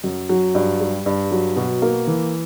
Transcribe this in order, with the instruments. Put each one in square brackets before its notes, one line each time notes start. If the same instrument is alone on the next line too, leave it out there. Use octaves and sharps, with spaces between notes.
[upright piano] F#2
F#3
G2
G3
G2
F#3
B2
A#3
E3